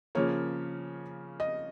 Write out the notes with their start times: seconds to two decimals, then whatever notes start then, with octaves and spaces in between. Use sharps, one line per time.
0.15 C#3 F3 A#3 C#5
1.40 D#5